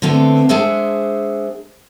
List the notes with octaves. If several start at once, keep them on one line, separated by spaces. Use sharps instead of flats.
D3 A3 B3 C4
G#3 D4 G#4 C5 E5 F#5